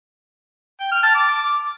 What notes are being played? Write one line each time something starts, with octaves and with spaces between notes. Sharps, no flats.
G5
F6
A5
D6